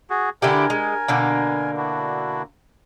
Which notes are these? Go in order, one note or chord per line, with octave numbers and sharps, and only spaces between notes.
F#4 G#4
D3 E4 G4 A#4 G#5
G#3
B2 D3 A#3
D4 E4 F#4